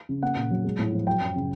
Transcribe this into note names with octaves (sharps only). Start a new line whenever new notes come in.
C#3
A#3 F#5
A#2
F#3
G#3
A2
F3
F#3 G5
F#2
C#3